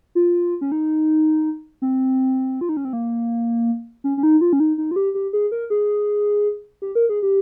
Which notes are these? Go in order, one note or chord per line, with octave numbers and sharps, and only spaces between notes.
F4
C#4
D#4
C4
F4
D#4
C#4
C4
A#3
C#4
C#4
D#4
F4
C#4
D#4
D#4
F4
G4
G4
G#4
A#4
G#4
G4
A#4
G#4
G4